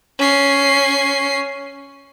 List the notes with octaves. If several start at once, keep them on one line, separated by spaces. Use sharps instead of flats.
C#4 C7